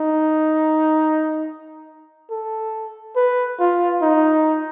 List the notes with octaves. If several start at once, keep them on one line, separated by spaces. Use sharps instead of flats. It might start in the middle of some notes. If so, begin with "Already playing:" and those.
Already playing: D#4
A4
B4
F4
D#4